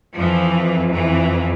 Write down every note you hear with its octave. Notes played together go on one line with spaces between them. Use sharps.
F2 E3 F3
E3